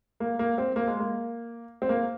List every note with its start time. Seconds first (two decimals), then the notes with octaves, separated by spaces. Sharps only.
0.20 A#3
0.39 A#3
0.58 C4
0.76 A#3
0.88 G#3
1.00 A#3
1.82 C4
1.89 A#3